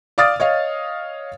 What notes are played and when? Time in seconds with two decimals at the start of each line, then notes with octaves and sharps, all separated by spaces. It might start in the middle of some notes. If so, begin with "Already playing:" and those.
0.18 D5 F5 D6 D#6 F6 A6
0.40 C#5 D#5 F5